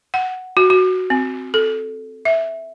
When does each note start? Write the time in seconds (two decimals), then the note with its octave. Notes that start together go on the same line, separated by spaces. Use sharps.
0.14 F#5
0.57 F#4
0.70 F#4
1.10 C4
1.54 A4
2.25 E5